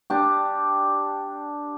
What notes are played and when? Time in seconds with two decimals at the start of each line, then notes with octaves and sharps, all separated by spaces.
0.10 D4 G4